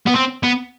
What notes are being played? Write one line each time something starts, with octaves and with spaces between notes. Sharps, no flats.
B3
C4
B3